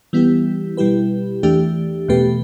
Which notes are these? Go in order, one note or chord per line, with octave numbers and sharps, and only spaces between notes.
E3 G3 B3 E4 G4
B2 G3 E4 G4 B4
E2 E3 A3 D4 G4
E2 B2 A3 G4 B4